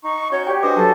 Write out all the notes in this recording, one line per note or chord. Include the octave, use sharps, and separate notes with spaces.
D#4 C#6
C#4 F#4 C#5 G6
G4 C#5 D5 G5
D4 F#4 B4 C5 D#5 D6
F#3 G4 A4 A5